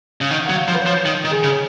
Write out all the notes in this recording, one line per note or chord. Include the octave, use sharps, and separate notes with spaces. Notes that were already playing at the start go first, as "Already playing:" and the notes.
C#3
D#3 F#5
F#3 F#5
F5
F3
B4
C#5
F3
D#3
D#3
G#4
C#3